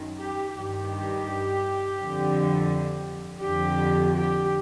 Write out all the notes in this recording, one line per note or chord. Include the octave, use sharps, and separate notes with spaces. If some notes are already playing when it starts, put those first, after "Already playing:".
Already playing: F#2 D#3
G4
G2 D#3 G4
F2 D3
F2 D3 G4
G4